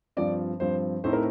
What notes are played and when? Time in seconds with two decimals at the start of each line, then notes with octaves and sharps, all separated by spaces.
0.17 G2 F3 C4 D5
0.60 G2 F3 C4 C5
1.04 A2 A3 C4 D#4 C5
1.13 A#4